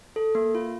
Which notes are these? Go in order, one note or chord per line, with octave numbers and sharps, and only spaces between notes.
A4
A#3
F4